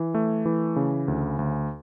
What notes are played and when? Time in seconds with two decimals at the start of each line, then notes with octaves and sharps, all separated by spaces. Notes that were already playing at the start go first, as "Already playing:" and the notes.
Already playing: E3
0.14 A3
0.45 E3
0.76 C#3
1.08 D2
1.39 D2